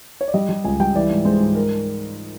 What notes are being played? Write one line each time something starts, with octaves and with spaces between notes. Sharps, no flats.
C#5
D5
G3 D#5
G3
C#2 G#5
G3 G5
E3 D5
G#2
G#3 C5
G#2
A#4